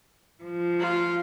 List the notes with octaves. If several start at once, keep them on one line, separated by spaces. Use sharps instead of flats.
F3
F4